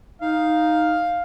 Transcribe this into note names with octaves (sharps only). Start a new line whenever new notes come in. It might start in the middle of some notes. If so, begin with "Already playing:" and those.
D#4 F5